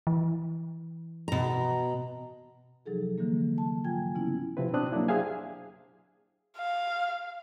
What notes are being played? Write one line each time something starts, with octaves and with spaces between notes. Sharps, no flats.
E3
B2 A#5
C3 F3 F#3 D#4 G#4 A4
D3 E3 G3 A#3
A5
G#2 F#3 F4 G5 G#5 G#6
C#3 B3 C#4 E4
C3 F3 C4 E4 B4
B2 C4 D4 D#6 F#6
F#3 A#3 D4 E4
G4 G#4 C5 E5 F5 G#5
F5